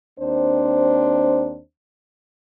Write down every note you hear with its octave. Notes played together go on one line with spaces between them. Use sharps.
D#2 C4 D4 C5